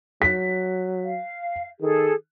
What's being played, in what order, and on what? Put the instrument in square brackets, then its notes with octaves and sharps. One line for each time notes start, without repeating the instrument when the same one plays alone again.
[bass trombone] F#3 [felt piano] B6
[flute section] F5
[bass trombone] D#3 [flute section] G#4 A4